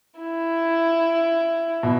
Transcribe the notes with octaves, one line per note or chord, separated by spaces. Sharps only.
E4
B2